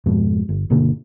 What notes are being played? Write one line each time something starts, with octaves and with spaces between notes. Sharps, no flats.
F2 G#2 B2
G1
G1 B2 D3 A#3